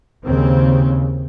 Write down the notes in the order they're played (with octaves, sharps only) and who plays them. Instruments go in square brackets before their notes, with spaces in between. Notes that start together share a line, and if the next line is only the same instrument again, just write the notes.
[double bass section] D#2 C#3 C4